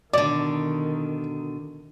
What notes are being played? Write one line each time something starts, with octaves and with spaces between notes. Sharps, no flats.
B2 D3 D#3 D5